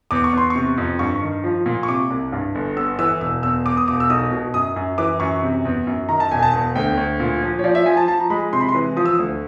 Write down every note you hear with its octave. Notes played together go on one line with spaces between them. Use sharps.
E2 D6
C#6
E2 C6
C3 C#6
F2
G2 C#6
D#3
F3
A#2
C#6
C3 D6
C2
G2
G1
B3 E6
E3 E6
E1 E6
E2 E6
E2 D6
D#6
E1 D6
E6
B1 D#6
B2
F#2 D#6
F#2
E3 D6
F#2 C#6
C3
E2
F#2
D#3 A#5
A5
E1 G#5
A5
E2
D2 G5
D2
A#2
F3
C#5
F3 D5
E5
F3 G#5
A5
F3 A5
A#5
G#3 B5
C3 C6
B5
C6
E3
F3 D#6
E6
D2 D#6